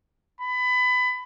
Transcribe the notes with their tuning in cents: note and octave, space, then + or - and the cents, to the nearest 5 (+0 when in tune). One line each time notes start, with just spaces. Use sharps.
B5 +20